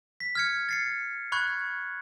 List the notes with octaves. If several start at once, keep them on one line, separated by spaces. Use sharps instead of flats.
B6
F6 G#6 C#7
A6 C7 C#7
B5 C#6 F#6 G#6